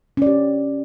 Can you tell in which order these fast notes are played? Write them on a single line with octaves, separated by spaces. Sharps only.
C#4 D5 G4